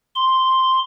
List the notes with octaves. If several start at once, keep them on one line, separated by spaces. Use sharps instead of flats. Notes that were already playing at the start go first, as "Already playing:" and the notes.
C6